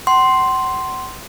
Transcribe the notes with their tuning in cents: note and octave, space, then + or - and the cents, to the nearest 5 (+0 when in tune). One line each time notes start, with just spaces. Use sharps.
F#5 +40 C6 +0